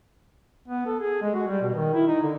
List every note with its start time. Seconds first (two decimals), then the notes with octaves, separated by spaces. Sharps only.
0.68 B3
0.87 A4
1.00 G#4
1.22 G#3
1.35 F#4
1.47 G3
1.62 B2
1.74 D#3
1.94 E4
2.08 D#4
2.23 D3